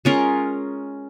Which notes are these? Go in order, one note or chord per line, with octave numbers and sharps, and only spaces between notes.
G#3 C#4 F4 A#4